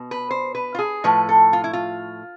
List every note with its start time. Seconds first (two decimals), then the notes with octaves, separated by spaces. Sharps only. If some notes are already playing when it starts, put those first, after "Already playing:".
Already playing: B2
0.11 B4
0.31 C5
0.55 B4
0.75 F4
0.79 G#4
1.04 A2 F3 A3 B4
1.29 A4
1.53 F4
1.64 E4
1.73 F4